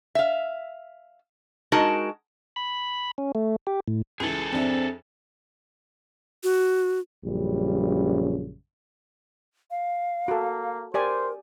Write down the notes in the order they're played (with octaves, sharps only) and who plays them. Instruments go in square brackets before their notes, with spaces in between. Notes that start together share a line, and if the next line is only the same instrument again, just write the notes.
[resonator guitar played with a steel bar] E5 F5
G#3 D#4 F#4 A#4 A5
[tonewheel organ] B5
C#4
A3
G4
A2
[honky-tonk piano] C#2 E3 [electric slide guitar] G#4 A4
[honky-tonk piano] F2 D4 E5 [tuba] C4
[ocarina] F#4
[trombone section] A#1 F#2 C#3 G3
[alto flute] F5
[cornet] A#3 [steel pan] F#4 A4
[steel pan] G4 D5 G#5 [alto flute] A#4 [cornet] C5